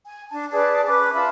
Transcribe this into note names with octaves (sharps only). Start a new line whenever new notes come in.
G#5
D4 A5
G#4 B4 D5 A5
C#4 B4 D6
F4 E5 A5 B5